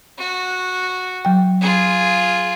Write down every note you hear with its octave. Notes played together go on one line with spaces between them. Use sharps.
F#4
F#3 G5
F4 G#4